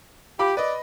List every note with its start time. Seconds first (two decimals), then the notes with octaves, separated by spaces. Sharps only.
0.39 F4 G4 B5 D6
0.57 B4 D5 D#5